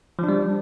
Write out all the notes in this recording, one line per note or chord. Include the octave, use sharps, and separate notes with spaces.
F3 G3 D4